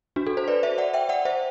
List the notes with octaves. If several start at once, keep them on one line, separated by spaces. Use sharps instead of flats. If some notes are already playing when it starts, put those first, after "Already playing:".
D4 F#4
F#4 A4
A4 C5
B4 D5
C5 E5
D5 F#5
E5 G5
D5 F#5
C5 E5